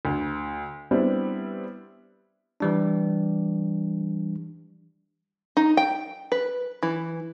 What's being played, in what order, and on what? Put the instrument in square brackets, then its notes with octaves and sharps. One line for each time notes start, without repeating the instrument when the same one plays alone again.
[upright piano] D2
G3 B3 C4 D4 E4
[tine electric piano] E3 G3 D4
[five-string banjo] D#4
G5
B4
E3